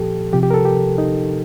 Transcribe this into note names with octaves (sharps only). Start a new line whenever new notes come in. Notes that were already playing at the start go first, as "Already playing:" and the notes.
Already playing: A#2 F3 G4 A4
C3 F3 G4
G4
A#4
A4
G4
D#4